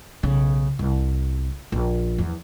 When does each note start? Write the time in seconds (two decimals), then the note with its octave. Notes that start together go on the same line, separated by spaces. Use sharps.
0.23 B1 C#3
0.79 C2
1.72 A#1
2.18 E2 F3